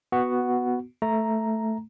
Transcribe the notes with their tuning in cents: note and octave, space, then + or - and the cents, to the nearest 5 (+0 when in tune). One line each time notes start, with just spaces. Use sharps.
B3 +0 F#4 +0
A3 +0 A#5 +0